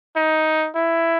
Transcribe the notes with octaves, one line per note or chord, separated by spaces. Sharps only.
D#4
E4